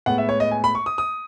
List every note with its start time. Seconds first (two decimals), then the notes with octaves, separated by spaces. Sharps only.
0.06 A2 G#3 B3 F#5
0.18 E5
0.29 C#5
0.40 D#5
0.51 G#5
0.64 B5
0.75 C#6
0.86 D#6
0.98 D#6